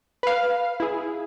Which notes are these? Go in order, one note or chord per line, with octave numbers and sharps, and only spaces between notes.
B4 F5
E4 G#4